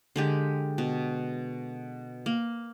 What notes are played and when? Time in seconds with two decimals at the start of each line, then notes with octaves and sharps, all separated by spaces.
0.16 D3 G#3 G4
0.78 B2
2.26 A#3